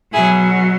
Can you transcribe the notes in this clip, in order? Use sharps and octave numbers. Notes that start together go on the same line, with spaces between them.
B2 F#3 E4 G#4